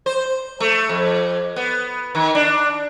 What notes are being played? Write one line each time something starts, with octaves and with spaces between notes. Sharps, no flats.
C5
A3
F2
B3
D#3
D4